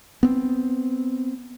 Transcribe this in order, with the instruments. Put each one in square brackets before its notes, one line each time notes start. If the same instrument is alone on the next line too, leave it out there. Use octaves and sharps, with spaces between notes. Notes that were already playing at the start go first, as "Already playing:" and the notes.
[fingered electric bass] B3 C4